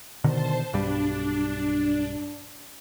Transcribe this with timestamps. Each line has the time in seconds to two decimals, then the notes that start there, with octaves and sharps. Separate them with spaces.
0.24 B2 D3 D#3 C5 A5
0.73 B1 G2 G3 D4